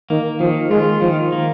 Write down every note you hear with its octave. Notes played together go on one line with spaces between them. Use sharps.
D#3 A#3
D#3 F3
G#3 F4
D#3 F3
A#3